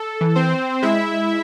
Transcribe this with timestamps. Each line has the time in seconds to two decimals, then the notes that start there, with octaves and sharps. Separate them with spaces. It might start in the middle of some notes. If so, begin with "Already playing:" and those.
Already playing: A4
0.21 E3
0.35 C4 C5
0.83 G#3 E4 E5